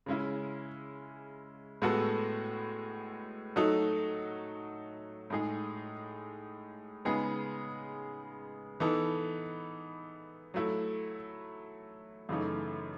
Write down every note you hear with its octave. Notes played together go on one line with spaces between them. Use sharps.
C#3 G#3 C#4 E4
A2 G#3 B3 F#4 A4
F#3 A3 D#4 F#4 A4
A2 G#3 D#4 G#4
C#3 G#3 B3 D#4 G#4
E3 B3 D#4 A4
F#3 A3 E4
F#2 C#3 E3 A3 D#4